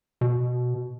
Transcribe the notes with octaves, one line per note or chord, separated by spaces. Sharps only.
B2